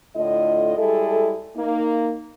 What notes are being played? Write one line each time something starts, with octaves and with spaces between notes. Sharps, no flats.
A2 D3 A3 F4 D#5
G3 G#3 E4 G#4 A4
A#3 D#4